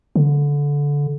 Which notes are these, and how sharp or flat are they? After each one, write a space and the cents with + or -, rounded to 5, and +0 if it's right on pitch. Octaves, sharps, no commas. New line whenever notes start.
D3 -20